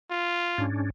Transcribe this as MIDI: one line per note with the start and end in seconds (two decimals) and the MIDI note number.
0.11 0.66 65
0.58 0.90 44
0.58 0.90 61
0.58 0.90 62